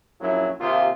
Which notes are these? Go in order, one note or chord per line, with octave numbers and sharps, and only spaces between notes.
A#1 F#2 F#3 E4
D#2 C3 F4